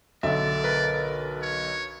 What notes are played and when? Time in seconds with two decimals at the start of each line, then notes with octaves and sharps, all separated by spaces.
0.23 B1 D3 D5 E5
0.64 A#4 B4
1.42 C#5